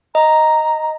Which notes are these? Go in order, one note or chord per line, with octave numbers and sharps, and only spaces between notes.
D#5 A#5